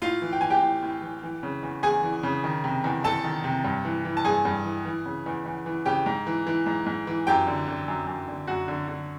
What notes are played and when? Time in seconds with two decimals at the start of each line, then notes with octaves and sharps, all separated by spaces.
0.02 A2 F4 F5
0.22 E3
0.33 G5
0.41 E3 G#5
0.50 G4 G5
0.62 A2
0.83 A2
1.02 E3
1.23 E3
1.43 C#3
1.63 E2
1.83 E2 G#4 G#5
2.03 E3
2.23 C#3
2.44 D#3
2.64 C3
2.84 E2
3.04 E2 A4 A5
3.24 D#3
3.44 C3
3.64 G2
3.85 E3
4.05 E3
4.17 A5
4.25 G2 G#4 G#5
4.45 G2
4.65 E3
4.85 E3
5.06 C#3
5.26 E2
5.46 E2
5.66 E3
5.86 C#3 G4 G5
6.06 G#2
6.27 E3
6.47 E3
6.66 G#2
6.86 G#2
7.07 E3
7.27 F#2 G4 G5
7.47 D3
7.68 D3
7.88 F#2
8.07 F#2
8.28 D3
8.47 F#2 F#4 F#5
8.68 D3
8.88 D3